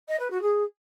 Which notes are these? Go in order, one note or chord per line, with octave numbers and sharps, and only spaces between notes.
D#5
B4
F#4
G#4